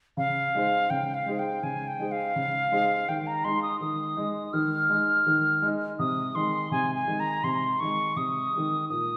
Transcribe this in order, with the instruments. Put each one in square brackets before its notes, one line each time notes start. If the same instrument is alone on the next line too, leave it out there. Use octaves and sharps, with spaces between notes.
[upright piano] C#3 [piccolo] F5
[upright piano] G#3 D#4 G#4 C5
[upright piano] C#3 [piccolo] G5
[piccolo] F5
[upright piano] G#3 D#4 G#4 C5
[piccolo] G5
[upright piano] C#3 [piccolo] G#5
[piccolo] G5
[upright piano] G#3 D#4 G#4 C5
[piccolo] F5
[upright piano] C#3
G#3 D#4 G#4 C5
[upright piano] D#3 [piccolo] G5
[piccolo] A#5
[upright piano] G#3 D#4 [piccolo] C6
[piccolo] D#6
[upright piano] D#3 [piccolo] D#6
[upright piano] G#3 D#4
[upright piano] D#3 [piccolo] F6
[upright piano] G#3 D#4
D#3
G#3 D#4
[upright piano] C3 [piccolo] D#6
[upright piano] D#3 G#3 [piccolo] C6
[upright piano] C3 [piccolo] G#5
[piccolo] G#5
[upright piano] D#3 G#3
[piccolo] A#5
[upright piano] C3 [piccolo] C6
[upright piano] D#3 G#3 [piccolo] C#6
[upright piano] C3 [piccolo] D#6
[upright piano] D#3 G#3
[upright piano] A#2 [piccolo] D#6